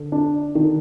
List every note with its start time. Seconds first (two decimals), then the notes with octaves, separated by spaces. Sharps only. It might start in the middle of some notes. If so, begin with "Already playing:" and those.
Already playing: D3
0.12 D4
0.55 D#3